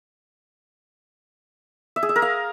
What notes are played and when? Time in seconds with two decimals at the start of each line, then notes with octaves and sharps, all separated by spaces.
1.96 E5
2.03 G#4
2.09 E5
2.16 A#4
2.22 F5